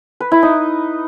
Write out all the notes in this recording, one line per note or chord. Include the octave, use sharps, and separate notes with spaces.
B4
E4
D#4